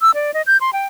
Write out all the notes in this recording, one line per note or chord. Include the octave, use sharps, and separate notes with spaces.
E6
D5
D#5
G6
C6
G5